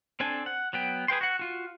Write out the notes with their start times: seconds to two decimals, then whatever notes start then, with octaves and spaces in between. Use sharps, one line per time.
0.20 C4 D4 A4 G#5
0.46 F#5
0.73 F#3 B3 G5
1.08 G#4 B4 G5 C6
1.21 F#4 F#5
1.39 F4 F#4